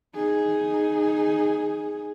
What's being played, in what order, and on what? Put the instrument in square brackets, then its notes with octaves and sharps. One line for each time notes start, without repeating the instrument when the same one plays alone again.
[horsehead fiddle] D#4 G#4